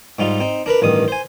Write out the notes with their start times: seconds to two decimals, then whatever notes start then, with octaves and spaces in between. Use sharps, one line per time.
0.19 G#2 G3 D#4 F4
0.40 C4 D#4
0.66 D4 A#4 B4 B5
0.82 A1 G2 D#3 D#6
1.08 C5 G#5